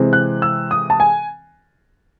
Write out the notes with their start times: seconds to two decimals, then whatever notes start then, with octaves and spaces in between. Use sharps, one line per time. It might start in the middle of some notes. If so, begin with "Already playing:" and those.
Already playing: C3 E3 G#3 C4
0.13 F#6
0.42 E6
0.71 D#6
0.90 A5
1.00 G#5